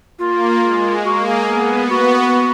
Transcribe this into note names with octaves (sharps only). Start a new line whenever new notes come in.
A#3 F4
G#3
A#3 F#4
G#4
B3
F#4